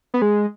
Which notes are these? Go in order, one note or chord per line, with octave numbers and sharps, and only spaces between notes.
B3
G#3